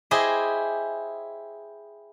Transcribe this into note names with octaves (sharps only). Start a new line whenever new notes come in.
E4 G4 G#4 C5 D#5